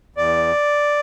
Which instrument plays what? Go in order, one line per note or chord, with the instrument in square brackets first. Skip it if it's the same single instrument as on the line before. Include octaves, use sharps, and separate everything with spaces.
[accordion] E2 D5